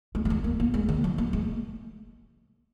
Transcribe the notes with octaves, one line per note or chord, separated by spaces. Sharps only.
G#3
F#3
G#3
A#3
A#3
G#3
D#3
F#3
A#3
G#3